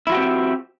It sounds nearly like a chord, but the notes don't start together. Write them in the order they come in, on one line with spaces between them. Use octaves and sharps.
E4 F3 F#4 G4 C4